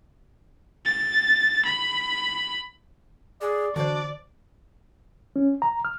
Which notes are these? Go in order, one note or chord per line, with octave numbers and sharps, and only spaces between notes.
A6
B5
G#4 D5
D3 E3 D4 F#4 C5 D5
C#4
A#5
F6